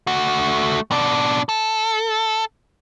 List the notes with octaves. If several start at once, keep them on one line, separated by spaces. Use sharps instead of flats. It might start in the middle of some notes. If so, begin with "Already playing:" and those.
A3 F#4
B2 D4
A4